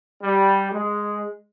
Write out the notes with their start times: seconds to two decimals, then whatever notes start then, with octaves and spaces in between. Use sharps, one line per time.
0.22 G3
0.72 G#3